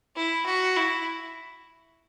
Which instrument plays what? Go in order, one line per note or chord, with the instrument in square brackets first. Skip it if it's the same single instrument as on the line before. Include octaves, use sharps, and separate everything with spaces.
[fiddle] E4
F#4
E4